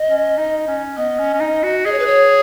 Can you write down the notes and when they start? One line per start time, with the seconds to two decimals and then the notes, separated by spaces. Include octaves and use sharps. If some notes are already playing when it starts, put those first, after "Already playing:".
Already playing: D#5
0.09 C#4
0.38 D#4
0.68 C#4
0.97 B3 D#5
1.19 C#4
1.33 C#4
1.40 D#4
1.63 F#4
1.85 G#4 D#5
1.92 C#5
1.99 B4
2.07 C#5